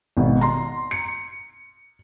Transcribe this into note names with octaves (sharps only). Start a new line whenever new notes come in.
G#1 B2
A#5 C6
C#7